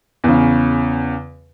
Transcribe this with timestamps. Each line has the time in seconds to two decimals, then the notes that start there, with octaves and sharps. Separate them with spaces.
0.24 E2 C#3